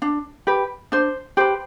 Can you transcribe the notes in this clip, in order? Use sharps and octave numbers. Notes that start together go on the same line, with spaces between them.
D4
G4 B4
D4 C5
G4 B4 C5